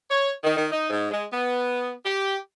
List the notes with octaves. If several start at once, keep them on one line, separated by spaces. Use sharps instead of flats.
C#5
D#3
D#3
D#4
G#2
G#3
B3
G4